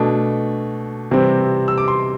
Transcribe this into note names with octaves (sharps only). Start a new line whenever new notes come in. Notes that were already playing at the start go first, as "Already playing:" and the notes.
Already playing: B2 A3 D4
C3 E3 G3 C4
E6
D6
C6